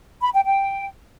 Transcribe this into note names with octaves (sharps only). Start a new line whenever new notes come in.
B5
G5
G5